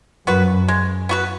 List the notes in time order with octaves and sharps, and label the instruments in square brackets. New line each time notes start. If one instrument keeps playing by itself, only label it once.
[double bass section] F#2 [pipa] B3 F#4 B4
[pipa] G#3
B3 F#4 B4